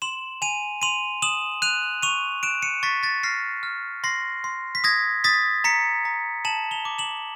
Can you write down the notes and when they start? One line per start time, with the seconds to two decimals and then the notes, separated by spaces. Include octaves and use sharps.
0.02 C6 E7 F#7
0.42 G#5 D#7 F7
0.82 C6 D#7 F7
1.22 D#6 E7 F#7
1.62 F#6 D#7 F7
2.02 C#6 D#7 F7
2.43 F#6 D7 E7
2.62 C#7 D#7
2.83 C#6 A6 B6
3.03 A6 B6
3.23 F6 A#6 C7
3.63 F6
4.04 C6 A#6 C7
4.44 C6
4.75 B6
4.84 D#6 G#6 A#6
5.24 D#6 A6 B6
5.64 A#5 B6 C#7
6.05 A#5
6.45 A5 E7 F#7
6.71 F7 G7
6.85 D6
6.98 E7 F#7